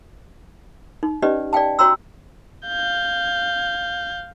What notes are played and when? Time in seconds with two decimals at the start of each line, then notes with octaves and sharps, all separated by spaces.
1.03 D#4
1.22 C#4 D#4 G4 B4 D5 D#5
1.53 D5 F5 G5 A5
1.79 F#4 C#5 G5 A#5 C6 E6
2.66 F5 G6